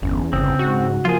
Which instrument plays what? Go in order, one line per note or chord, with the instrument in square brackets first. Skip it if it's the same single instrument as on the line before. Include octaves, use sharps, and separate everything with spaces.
[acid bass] G1 [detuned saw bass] E2 [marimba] C#4
[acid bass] G1 [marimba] C#3 D#6 [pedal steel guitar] C4
[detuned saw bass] G#2 [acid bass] F#4
[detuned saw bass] F3 [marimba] A#3 A#4 [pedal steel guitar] F4 G#4